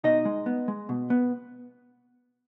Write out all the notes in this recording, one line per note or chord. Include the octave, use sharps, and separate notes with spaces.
B2 D#4 D#5
G#3
B3
G#3
B2
B3